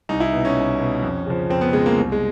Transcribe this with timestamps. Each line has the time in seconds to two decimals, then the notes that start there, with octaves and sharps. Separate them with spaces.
0.09 C2 D#4
0.20 E4
0.33 B2
0.45 C#4
0.57 C2
0.80 B2
1.03 F2
1.26 C#3 F3
1.50 F2 C4
1.61 B3
1.73 C#3 F3 G#3
1.86 A#3
1.97 C2
2.12 G#3